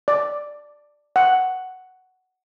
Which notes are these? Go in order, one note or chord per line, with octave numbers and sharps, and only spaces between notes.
D5
F#5